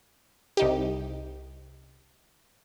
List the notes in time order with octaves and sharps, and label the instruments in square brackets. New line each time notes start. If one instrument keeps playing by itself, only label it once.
[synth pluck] C2 D#4 G4